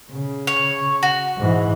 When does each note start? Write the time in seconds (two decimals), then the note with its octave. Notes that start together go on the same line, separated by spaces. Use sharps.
0.12 C#3
0.47 C#5
1.03 F#4
1.37 G#2 E3